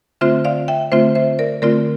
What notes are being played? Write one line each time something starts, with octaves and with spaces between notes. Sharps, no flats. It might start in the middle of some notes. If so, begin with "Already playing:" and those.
D3 A3 C4 F4 C5 E5
D5 F5
E5 G5
D3 A3 C4 F4 C5 E5
C5 E5
A#4 D5
D3 A3 C4 F4 A#4 D5